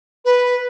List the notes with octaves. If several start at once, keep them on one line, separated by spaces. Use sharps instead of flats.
B4